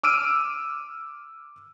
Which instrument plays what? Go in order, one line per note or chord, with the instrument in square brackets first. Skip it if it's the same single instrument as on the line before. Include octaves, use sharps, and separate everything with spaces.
[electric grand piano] D6 E6 F6 D7 D#7